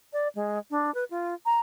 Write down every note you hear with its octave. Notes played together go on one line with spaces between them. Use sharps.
D5
G#3
D4
B4
F4
A#5